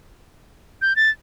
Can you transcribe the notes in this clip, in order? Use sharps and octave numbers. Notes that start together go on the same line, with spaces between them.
G6
A6